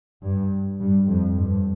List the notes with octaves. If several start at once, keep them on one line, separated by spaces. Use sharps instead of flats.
G2
G2
F2
G2